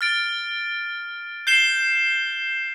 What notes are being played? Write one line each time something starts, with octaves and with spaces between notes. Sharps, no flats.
F6 A6 D7
G6 C7 E7 G7